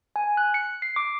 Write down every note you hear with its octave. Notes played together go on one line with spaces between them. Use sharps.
G#5
F#6
C#7
C7
D6